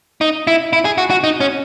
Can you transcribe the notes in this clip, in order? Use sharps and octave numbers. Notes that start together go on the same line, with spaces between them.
D#4
E4
E4
G#4
F#4
F#4
D#4
C#4